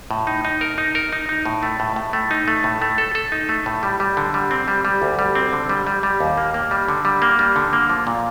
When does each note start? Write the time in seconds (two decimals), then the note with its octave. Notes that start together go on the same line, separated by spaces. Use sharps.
0.11 A2
0.27 D#4
0.45 D#4
0.61 A#4
0.78 D#4
0.95 A#4
1.12 D#4
1.29 D#4
1.46 A2
1.63 A3
1.80 A2
1.96 A2
2.13 A3
2.31 D#4
2.48 A3
2.64 A2
2.82 A3
2.98 A4
3.15 A4
3.32 D#4
3.49 A3
3.66 A2
3.83 G3
4.00 G3
4.17 D3
4.34 G3
4.51 C4
4.68 G3
4.85 G3
5.02 D2
5.19 G3
5.35 C4
5.53 D3
5.69 G3
5.86 G3
6.03 G3
6.20 D#2
6.37 A#3
6.54 A#3
6.71 G3
6.88 D3
7.05 G3
7.22 A#3
7.39 G3
7.56 D3
7.73 A#3
7.90 F3
8.07 A#2